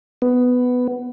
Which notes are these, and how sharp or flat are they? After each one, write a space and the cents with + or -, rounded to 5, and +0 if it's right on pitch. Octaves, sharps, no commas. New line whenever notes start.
B3 +10